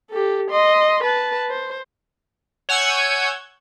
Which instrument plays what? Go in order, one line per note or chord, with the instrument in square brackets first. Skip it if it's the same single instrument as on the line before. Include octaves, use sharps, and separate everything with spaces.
[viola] G4 A4
D#5 C6
B4 A5
C5
[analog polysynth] C#5 F#5 G#5 E6 G6 G#6